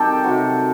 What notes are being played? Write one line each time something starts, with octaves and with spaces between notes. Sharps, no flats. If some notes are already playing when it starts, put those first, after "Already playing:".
Already playing: C3 D#3 G3 G4 A4
C3 D#3 F#3 C4 F#4